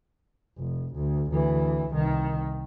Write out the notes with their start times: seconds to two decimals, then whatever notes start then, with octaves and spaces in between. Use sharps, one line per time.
0.58 F1
0.95 D2
1.31 D2 E3
1.90 C2 D#3